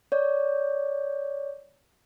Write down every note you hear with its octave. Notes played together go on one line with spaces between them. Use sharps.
C#5 D5